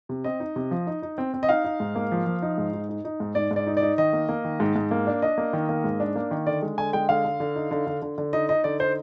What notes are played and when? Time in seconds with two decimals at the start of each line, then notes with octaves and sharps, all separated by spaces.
0.09 C3
0.24 C4 D#5
0.40 D#4
0.56 C3
0.71 F3
0.87 D#4
1.02 D#4
1.18 C4
1.34 C4
1.43 D#5
1.49 D#4 F5
1.65 D#4
1.80 G#2
1.95 A#3
2.12 F3
2.27 F3
2.42 D#4
2.58 G#2
2.73 D#4
2.89 D#4
3.05 D#4
3.20 G#2
3.35 G#2 D5
3.51 G#2
3.56 D5
3.67 D#4
3.77 D5
3.82 D#4
3.98 D#3 D#5
4.13 A#3
4.29 A#3
4.44 D#3
4.60 G#2
4.76 G#2
4.91 A#3
5.07 D4
5.22 D4 D#5
5.38 A#3
5.53 D#3
5.69 A#3
5.84 G#2
6.00 D4
6.16 A#3
6.31 D#3
6.46 D3 D5
6.62 G#3
6.78 D3 G#5
6.93 G#3 G5
7.09 D3 F5
7.25 D3
7.40 D3
7.56 D#4
7.71 D3
7.87 D3
8.02 D3
8.18 D3
8.33 D#4 D#5
8.49 D#4 D#5
8.64 D3 D5
8.80 D#4 C5